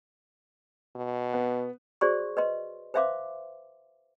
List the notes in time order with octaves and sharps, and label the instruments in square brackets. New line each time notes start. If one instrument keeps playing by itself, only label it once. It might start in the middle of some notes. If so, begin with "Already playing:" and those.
[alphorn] B2
[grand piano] B3
[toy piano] F#4 G#4 C5 D5 C6 C#6
B4 D#5 C6
B4 C5 E5 F5 C6 D6